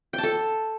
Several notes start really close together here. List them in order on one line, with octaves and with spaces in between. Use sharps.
G5 A5 A4